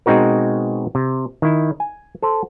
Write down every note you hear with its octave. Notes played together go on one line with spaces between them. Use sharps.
B2 G#3 C4 D#4 F#4 A#4
C3
D#3 E4
G#5
A4 C5